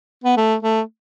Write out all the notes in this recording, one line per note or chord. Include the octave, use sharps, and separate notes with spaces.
B3
A3
A3